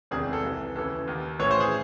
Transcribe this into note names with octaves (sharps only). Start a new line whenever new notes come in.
E1 E2 C3 D#3 G#4
A4
C2 C3 E3
D#2 C#3 E3 A4
D#2 D#3
A1 A2 E3 C#5
C5
G#4